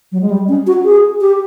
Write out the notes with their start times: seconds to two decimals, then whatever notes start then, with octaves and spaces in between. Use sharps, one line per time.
0.12 F#3
0.22 G#3
0.30 G3
0.49 C#4
0.67 F#4
0.85 G#4
1.21 G4